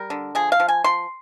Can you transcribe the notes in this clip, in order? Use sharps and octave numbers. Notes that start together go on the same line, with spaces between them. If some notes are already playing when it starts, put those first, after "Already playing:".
Already playing: G3 A#4
D3
F3 G#4
F5
F3
G#5
F3 C6